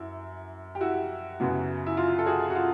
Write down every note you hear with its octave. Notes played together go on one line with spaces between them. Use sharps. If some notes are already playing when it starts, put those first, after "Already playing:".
Already playing: F#2 E4
G4
E4 F#4
F#2 C#3 F#3 B3
E4
F4
A4
F#4 G#4
F#4
F4